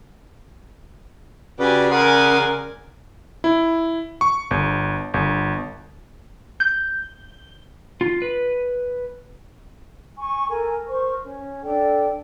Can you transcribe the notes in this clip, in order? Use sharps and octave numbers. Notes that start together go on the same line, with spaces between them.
C#3 F#4 G4 B4 D5 G#5
A#4 D5 F#5 G#5 C6 D#6
E4
C#6
G1
G1
G6
F4
B4
G#5 C#6
A4 A#4 G#5
A#4 C5 C#6
C#4
D4 A4 D5 G5